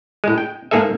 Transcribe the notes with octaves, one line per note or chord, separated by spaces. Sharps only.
A2 G#3
G5
G#2 A#3 G#4 A4 E5